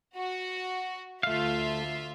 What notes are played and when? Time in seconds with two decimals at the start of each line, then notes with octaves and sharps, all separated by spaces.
0.15 F#4
1.23 D2 A3 F4 E5 F5